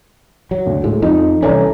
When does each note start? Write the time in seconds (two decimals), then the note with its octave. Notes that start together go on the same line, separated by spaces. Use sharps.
0.51 F#3
0.66 D2
0.84 A2 G#3
1.02 F2 D#4
1.42 C2 E3 C#4 A4 D5 A#5